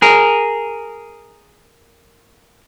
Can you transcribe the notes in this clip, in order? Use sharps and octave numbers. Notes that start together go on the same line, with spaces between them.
G#4 A#4